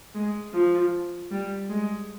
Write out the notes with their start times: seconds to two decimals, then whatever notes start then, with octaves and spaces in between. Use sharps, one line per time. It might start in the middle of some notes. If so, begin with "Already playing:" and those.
0.15 G#3
0.53 F3
1.31 G3
1.69 G#3